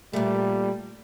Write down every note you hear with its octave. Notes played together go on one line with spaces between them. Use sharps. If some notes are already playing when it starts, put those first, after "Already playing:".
A#2 G3 A3